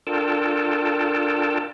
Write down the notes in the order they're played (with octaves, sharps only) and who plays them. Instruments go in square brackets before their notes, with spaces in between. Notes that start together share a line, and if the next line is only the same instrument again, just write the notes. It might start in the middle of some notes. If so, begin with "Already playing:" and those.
[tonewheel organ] D4 F4 A4 A#4 G5 A5